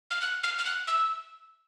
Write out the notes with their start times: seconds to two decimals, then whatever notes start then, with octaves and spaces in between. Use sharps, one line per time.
0.11 F6
0.22 F#6
0.43 F6
0.58 F6
0.65 F#6
0.87 E6